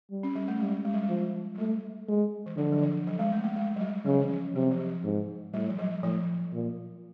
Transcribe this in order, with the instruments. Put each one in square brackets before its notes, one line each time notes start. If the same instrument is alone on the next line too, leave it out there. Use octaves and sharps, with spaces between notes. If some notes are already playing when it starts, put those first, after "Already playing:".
[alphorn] G3
[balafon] C#4
G3
A3
[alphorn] G3 [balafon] G#3
[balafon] G#3
G3
G#3
[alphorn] F3
[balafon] F#3
[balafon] G3 [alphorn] A3
[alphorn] G#3
[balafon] E3
[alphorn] D3 [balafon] F3
[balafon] F#3
F3
F#3
G#3
A3
A#3
G#3
F#3
G3
[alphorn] C#3 [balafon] F#3
[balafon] E3
F3
[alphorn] C3 [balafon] F#3
[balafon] F3
F#3
[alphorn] G#2
[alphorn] A2 [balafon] G3
[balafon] F3
F#3
[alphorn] A2 [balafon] F3
[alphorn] A#2